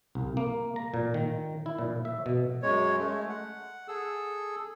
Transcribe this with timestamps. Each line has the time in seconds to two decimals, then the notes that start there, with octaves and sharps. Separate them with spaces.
0.15 C2
0.37 A#3
0.76 A#5
0.94 A#2
1.14 D#3
1.66 E4
1.79 A#2
2.05 E5
2.26 B2
2.62 F#2 G#3 C#5
2.98 G#3 A3
3.29 F#5
3.88 G#4 A4 E6